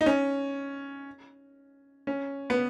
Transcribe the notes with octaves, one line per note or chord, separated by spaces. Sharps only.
D#4
C#4
C#4
B3